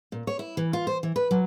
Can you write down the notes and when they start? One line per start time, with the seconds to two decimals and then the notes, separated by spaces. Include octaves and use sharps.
0.12 A#2
0.27 C#5
0.39 E4
0.57 E3
0.73 F4
0.87 C5
1.03 E3
1.16 B4
1.31 F#3